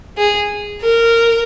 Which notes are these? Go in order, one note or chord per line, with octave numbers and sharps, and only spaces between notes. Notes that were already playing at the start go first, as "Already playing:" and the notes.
G#4
A#4